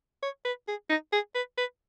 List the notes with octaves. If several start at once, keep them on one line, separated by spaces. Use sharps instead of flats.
C#5
B4
G#4
D#4
G#4
B4
B4